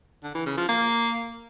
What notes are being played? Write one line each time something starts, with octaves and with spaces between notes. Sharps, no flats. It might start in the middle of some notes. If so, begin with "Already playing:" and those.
D3
E3
C#3
F3
A#3